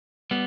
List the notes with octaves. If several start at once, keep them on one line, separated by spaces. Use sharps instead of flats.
G3 B3